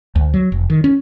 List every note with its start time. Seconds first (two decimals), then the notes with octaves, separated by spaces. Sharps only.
0.16 D2
0.34 F#3
0.52 F1
0.70 D#3
0.84 C#4